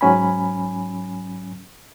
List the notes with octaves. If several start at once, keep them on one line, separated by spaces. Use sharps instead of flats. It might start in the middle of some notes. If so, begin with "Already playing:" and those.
G#2 F#3 C#4 G#5 B5